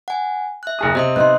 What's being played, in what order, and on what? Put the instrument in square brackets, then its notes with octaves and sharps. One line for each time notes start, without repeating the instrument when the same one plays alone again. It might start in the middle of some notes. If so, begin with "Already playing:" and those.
[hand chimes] F#5 G#5
E5 F#6
[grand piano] F#1 G#4 D#6
[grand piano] C3 [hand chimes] D#5 E5 D#6
[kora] B3 D#4 [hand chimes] C6 F#6